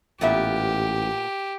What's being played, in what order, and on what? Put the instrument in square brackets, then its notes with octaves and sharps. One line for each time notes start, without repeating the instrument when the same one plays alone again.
[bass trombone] A1 [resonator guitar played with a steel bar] A#2 B3 E5 [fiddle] G4